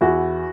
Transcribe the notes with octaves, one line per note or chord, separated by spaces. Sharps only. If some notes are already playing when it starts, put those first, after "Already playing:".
E2 E4 F#4